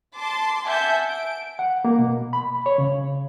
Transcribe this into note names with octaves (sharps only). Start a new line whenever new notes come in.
A5 C6 D6
E5 F#5 G#5 A5 G6
D7
F#5
A#3
B2
B5
C#5
C#3